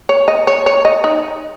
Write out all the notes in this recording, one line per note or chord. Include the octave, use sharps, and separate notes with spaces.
C#5
D#5
C#5
C#5
D#5
D#4